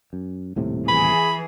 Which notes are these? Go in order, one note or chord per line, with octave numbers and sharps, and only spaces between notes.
F#2
D#1 A2 C3
E3 G#4 B5